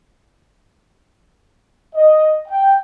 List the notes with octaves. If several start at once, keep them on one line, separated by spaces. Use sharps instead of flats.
D#5
G5